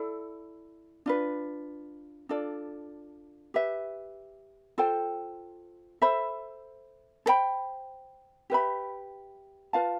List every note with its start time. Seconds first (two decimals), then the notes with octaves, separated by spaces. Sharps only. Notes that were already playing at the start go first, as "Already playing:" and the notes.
Already playing: E4 A4 D5
1.06 D4 F4 B4
2.29 D4 F4 A4 D5
3.54 G4 B4 E5
4.78 F4 A4 C5 G5
6.02 A4 C5 E5 B5
7.26 A4 C5 G5 B5
8.50 G4 B4 E5 B5
9.73 F4 B4 F5 A5